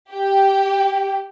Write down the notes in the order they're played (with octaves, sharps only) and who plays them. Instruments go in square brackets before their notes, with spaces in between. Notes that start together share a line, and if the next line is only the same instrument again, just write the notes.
[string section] G4